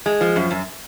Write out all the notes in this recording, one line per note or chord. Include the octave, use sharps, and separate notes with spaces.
G#3
F3
F#2
F#2